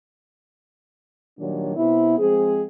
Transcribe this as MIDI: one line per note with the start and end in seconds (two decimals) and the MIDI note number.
1.39 1.75 46
1.39 1.75 51
1.39 1.75 54
1.39 1.75 55
1.39 1.75 62
1.39 1.75 73
1.77 2.15 48
1.77 2.15 59
1.77 2.15 64
2.19 2.64 53
2.19 2.64 56
2.19 2.64 60
2.19 2.64 68